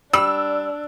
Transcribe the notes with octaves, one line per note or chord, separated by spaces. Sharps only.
G3 D4 E6